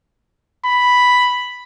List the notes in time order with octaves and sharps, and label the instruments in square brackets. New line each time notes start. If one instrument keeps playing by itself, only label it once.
[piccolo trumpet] B5